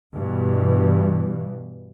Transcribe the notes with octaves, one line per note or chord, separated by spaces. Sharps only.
G2 B2 E3